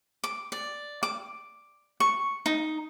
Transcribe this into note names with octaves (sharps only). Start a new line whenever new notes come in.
D6
D5
D6
C#6
D#4